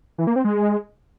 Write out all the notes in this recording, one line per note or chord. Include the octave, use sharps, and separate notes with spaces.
E3
A#3
C4
G#3